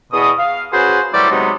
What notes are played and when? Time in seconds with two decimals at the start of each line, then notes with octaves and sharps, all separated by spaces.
0.12 E2 B2 D#6
0.38 F5
0.73 C#4 F#4 G#4 B4 C5
1.13 E3 F#3 G3 A3 C5 D5
1.30 C3 F#3 G#3 B3 D#4